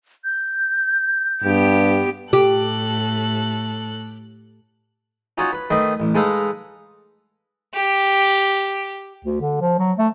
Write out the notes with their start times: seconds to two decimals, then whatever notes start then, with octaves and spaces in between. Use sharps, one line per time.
0.24 G6
1.44 G2 B3 G4
2.33 A2 G4 A4 F#6
5.38 C#4 D#4 F4 F#4 C#5
5.53 B4
5.71 D#3 A3 B4 D#5 C6
6.00 A1
6.15 G#3 D#4 A4 B4 F5 A#5
7.74 G4
9.25 D2
9.41 D3
9.61 F3
9.79 F#3
9.98 A3